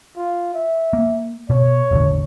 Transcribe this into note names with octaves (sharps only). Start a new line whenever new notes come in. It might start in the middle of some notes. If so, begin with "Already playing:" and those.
F4
E5
A#3
B2 C#5
E1 A1 D3